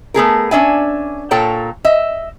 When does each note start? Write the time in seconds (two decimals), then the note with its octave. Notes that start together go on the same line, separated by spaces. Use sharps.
0.14 A3 B3 G#4 A#4
0.51 C#4 D4 E5 G#5
1.31 A#2 A4 C#5 G5 A#5
1.85 D#5 E5